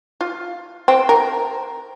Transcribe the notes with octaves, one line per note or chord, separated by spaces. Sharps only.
F4
C4
A#4